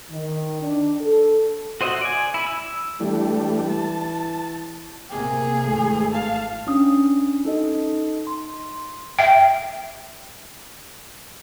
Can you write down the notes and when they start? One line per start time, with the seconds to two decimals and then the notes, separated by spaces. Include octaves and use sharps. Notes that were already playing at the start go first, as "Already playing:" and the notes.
0.11 D#3
0.62 D4
1.01 A4
1.81 F#4 C5 D#5 E5 F#5
2.01 D5 G#5
2.34 E4
2.47 E6
3.00 E3 G3 A3 D4
3.69 A5
5.10 C3 A#3 G#4
5.64 G#1 E3 A3
6.12 F5 A5
6.67 C#4 D4 D#6
7.45 D#4 A4 D#5
8.27 C6
9.19 E5 G5